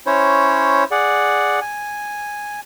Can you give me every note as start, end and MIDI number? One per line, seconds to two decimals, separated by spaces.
0.06 0.84 61
0.06 0.84 64
0.06 0.84 72
0.06 0.84 73
0.91 1.60 68
0.91 1.60 74
0.91 1.60 78
1.61 2.60 80